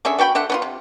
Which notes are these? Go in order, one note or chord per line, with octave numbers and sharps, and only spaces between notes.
D3 C#4 G#4 E5
B3 F#4 G5 B5
D3 E5 F#5
B3 C#4 F4
C3